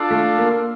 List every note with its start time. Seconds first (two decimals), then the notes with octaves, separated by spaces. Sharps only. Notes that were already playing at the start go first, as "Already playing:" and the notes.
Already playing: D4 F4 A4 D5 F5
0.11 A3
0.38 A#3